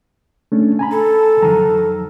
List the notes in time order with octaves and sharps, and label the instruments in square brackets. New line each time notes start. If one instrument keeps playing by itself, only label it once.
[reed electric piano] A3 C#4 D4
G#5 A#5 B5
[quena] A4
[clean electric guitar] F2 D#3 F#3 [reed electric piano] A#5